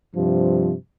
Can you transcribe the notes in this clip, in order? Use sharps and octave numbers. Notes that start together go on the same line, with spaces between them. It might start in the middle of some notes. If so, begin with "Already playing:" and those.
G2 C3 F3